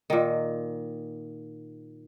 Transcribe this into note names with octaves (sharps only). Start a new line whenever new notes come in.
A#2 D#3